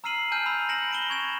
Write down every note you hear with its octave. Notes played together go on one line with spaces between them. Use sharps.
A#5 E6 F6 C7 D#7 F#7
G#5 A5 F6 G6 D#7
B5 E6
B5 A#6 C#7 D7 E7 F#7
B5 A#6 D7 E7 G7
B5 C#6 G#6 E7